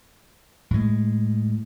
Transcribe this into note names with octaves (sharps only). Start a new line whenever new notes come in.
A2 G#3